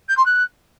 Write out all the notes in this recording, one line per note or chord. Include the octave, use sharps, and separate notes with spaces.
G6
C6
F#6